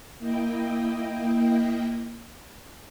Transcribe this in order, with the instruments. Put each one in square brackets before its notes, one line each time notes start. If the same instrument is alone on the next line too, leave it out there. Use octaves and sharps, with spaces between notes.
[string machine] A#3 E4 D#5 G5